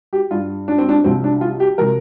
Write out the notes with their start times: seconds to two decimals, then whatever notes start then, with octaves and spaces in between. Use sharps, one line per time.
0.13 G4
0.31 G2 G3 F4
0.68 D4
0.78 C4
0.89 D4
1.04 C2 C3 F3 C4
1.24 D4
1.41 F4
1.60 G4
1.78 C3 F3 A#4